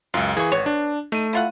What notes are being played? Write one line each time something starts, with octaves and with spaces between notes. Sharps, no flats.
C#2 F#2 F4
E3 A#3 G#4 C#6
G#1 B3 C#5
D4
A3 D#4 D#7
E4 F4 F#5